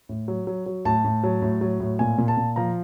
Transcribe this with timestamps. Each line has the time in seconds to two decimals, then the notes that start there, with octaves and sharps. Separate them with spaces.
0.09 A2
0.28 F#3
0.47 F#3
0.66 F#3
0.85 A2 A5
1.04 A2
1.24 F#3
1.42 A2
1.61 F#3
1.80 A2
1.99 A#2 G#5
2.18 A#2
2.28 A5
2.37 A#2
2.56 F3 A#5